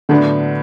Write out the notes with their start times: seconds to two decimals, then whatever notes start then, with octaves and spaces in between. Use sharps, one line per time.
0.09 A2 D3 F#3 B3 D4